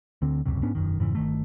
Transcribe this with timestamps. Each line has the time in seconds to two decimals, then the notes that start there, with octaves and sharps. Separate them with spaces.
0.22 D2 D3 C4
0.45 D#1 C#2 F#2 C3
0.63 G#2 B3 C#4 D4
0.75 E1 B1 F#2 D#3
0.99 F2 G#2 C#3 E3
1.15 G1 D#3 A3